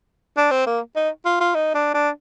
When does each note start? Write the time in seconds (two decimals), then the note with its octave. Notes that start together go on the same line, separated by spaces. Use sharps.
0.37 D4
0.51 C4
0.66 A#3
0.96 D#4
1.25 F4
1.40 F4
1.55 D#4
1.74 D4
1.94 D4